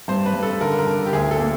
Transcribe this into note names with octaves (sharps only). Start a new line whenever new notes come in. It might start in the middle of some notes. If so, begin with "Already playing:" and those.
G2 C5
B4
G2
A4
D3 A#4
A#4
D3
G4
D2 G#4
A4
A#3